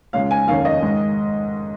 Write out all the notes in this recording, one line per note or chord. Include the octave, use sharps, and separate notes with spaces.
C#2 C#3 G#3 C#4 F5
G#5
F1 D#2 D#3 C#4 F5
D#5
G#2 D#3 G#3 D#4